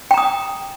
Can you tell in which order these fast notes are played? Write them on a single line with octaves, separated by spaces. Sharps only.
G5 A#5 D#6